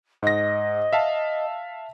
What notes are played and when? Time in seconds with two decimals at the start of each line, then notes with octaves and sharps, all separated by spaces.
0.22 G#2 D#5 A#6
0.93 E5 F5 A5